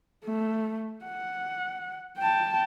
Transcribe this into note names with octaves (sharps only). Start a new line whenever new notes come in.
A3
F#5
G5 A5